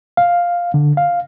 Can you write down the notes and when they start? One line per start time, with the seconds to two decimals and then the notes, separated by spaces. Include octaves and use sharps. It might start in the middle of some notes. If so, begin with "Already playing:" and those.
0.17 F5
0.74 D3
0.97 F5